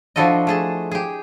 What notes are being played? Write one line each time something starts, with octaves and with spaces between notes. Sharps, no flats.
F3 D4 E4 F#4 A4 D#5
A3 G#4 A5
G4 G#4